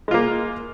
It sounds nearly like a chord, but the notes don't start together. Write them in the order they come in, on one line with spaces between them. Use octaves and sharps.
G#3 F4 A#3